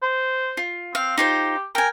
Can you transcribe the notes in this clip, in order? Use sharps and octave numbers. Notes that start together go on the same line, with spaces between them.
C5
F4
C4 F5
D#4 F4 G4 C5
A#4 G5 G#5